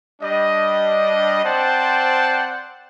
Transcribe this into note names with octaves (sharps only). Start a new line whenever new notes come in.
G3 D4 D#5
C4 C5 D5 F#5 G5 A5